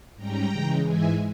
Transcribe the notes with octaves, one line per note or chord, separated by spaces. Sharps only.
G#2 G3 C#4 G5 A#5
C#3 E3 G#3
G#2 E3 G#3 E5 G#5